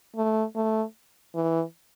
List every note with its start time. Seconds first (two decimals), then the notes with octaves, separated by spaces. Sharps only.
0.16 A3
0.56 A3
1.35 E3